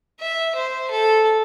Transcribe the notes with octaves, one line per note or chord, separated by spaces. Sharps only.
E5
C5
A4